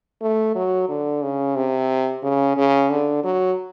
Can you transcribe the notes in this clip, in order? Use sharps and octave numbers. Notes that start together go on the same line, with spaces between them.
A3
F#3
D3
C#3
C3
C#3
C#3
D3
F#3